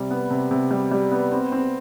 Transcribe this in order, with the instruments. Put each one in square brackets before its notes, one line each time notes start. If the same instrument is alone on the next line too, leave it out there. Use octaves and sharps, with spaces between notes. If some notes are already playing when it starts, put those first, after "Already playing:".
Already playing: [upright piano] C3 G3
B3
C3
C3
G3
G3
B3
C4
C4